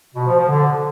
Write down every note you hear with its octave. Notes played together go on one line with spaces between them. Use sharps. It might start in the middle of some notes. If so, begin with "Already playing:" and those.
B2
F3
F3
D3